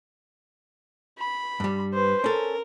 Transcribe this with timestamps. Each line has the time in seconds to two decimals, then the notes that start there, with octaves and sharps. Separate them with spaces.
1.19 B5
1.60 G2 G3
1.93 B4 C5
2.24 C#4 A4 A#4